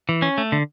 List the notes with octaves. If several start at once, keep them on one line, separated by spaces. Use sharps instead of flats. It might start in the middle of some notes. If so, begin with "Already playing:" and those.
E3
C#4
A3
D3